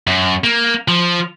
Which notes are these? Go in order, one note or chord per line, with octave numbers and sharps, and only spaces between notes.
F#2
A#3
F3